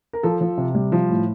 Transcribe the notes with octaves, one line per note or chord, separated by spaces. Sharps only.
A#4
F3 A4
F3
C3
G3
F3
A2